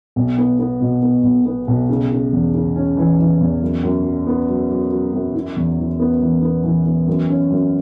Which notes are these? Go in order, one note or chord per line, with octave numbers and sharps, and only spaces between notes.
B1
B3
B3
B2
B3
B1
B3
B1
C#3
C#3
E2
C#3
C#4
E3
E3
E2
F#2
F#2
F#3
B3
F#3
F#3
F#3
F#2
E4
E2
E3
B3
E3
B3
E3
B3
F#2
C#4
F#2